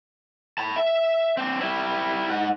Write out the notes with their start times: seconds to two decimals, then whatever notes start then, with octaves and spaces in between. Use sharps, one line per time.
0.58 A5 B5
0.76 E5
1.37 C4 D4
1.61 G3 E4
2.30 G#2 F#5